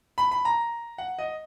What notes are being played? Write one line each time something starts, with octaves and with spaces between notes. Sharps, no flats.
B5
B5
A#5
F#5
D#5